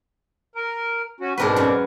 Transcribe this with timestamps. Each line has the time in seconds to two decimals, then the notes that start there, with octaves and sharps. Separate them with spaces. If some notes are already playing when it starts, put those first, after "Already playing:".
0.55 A#4
1.20 C#4 F#4
1.38 G#2 B2 C4 D4 A#4 B4
1.56 F#2